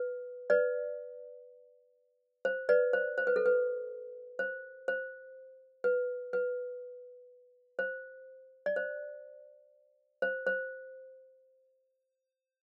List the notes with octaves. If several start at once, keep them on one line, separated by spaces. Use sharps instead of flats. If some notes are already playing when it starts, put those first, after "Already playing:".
Already playing: B4
B4 D5
C5
B4 D5
C5
C5
B4
A4
B4
C5
C5
B4
B4
C5
D5
C5
C5
C5